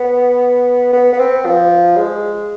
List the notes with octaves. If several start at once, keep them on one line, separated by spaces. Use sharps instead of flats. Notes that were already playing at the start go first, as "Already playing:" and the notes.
Already playing: B3
B3
B3
C4
F3
G#3